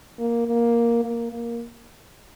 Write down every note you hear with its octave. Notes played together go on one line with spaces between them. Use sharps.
A#3
A#3
A#3
A#3